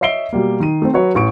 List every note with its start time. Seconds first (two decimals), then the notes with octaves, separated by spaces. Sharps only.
0.01 C#5 D#5 E5 C7 D7 G7
0.33 B2 G3 A#3
0.60 D#3 D#7
0.82 A3 C4
0.93 F#3 F#4 B4 C#5
1.15 A1 C#6 D7